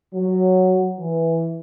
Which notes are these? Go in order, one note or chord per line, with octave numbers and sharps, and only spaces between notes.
F#3
E3